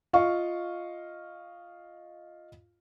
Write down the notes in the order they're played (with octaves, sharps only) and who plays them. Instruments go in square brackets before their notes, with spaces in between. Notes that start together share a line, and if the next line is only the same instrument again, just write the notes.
[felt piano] F4 D#5 F5 C#6